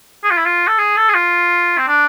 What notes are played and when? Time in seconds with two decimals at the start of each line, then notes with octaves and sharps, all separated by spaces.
0.24 G#4
0.31 F4
0.37 E4
0.46 F4
0.68 A4
0.78 G#4
0.96 A4
1.09 G#4
1.14 F4
1.78 C4
1.88 D4